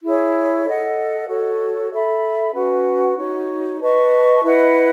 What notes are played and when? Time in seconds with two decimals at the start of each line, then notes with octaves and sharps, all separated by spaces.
0.03 E4 G#4 C#5
0.66 A4 D#5 F#5
1.28 F#4 A4 C#5
1.91 A4 E5 B5
2.54 C#4 F#4 B4 F#5
3.17 D#4 F#4 C#5
3.80 B4 D#5 A5 C#6
4.43 E4 B4 D#5 F#5